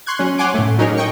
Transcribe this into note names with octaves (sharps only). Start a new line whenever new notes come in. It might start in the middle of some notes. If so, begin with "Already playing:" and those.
C6 C#6 F#6 G#6
F#3 C#4
C#5 F#5 G#5 C6 D6
A2 A3
F#3 C#4 D#4 G#4 A#4 C#5
D#5 G5 C#6